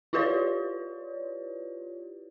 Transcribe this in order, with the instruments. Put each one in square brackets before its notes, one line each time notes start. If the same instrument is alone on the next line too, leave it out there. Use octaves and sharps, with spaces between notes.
[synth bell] E4 F4 G4 B4 C#5 D5